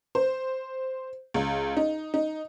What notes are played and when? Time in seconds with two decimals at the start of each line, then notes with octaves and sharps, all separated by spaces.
0.15 C5
1.34 C#2
1.77 D#4
2.14 D#4